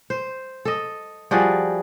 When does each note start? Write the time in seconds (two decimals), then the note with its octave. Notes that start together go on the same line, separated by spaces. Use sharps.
0.10 C5
0.65 A4 D#5
1.31 F3 G3 F#4 G#4